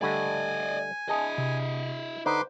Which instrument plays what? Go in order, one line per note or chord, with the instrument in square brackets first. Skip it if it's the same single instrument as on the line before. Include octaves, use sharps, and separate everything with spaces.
[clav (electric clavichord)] D3 G3 A3 [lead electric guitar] D5 D#5 [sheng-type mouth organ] G#5
[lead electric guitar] E4 D#5 [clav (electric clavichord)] G#4 A5
[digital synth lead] C3
[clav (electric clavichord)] D3 D#4 [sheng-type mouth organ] B4 C6 D6 [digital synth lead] C5